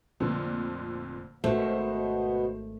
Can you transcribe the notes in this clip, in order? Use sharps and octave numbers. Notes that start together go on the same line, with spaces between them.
F1 F2 A#2 D3
G#1 B2 A3 B3 F#4 C5